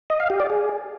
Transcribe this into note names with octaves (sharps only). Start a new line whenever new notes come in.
D#5
F5
G4
D5
G#4